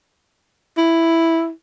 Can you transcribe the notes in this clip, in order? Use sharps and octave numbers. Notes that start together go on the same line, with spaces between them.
E4